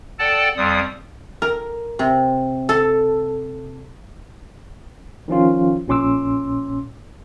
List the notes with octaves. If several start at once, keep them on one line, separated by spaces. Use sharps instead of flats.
A4 D5 F#5 G5 A5
F2 G3 D#6
A#4
C3
A4
D#3 F3 C#4 F4
A#1 A#2 C#4 C6 D6 E6